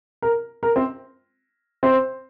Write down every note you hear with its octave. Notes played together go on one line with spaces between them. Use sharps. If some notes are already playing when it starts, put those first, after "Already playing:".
A#4
A#4
C4 C5
C4 C5